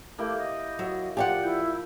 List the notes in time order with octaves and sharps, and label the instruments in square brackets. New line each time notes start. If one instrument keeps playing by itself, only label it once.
[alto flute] A3 [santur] A#3 E4 G4
[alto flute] D#5
[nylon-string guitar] F#3 [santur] E6
[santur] F3 [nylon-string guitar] G4 D5 F#5
[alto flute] E4 [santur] G5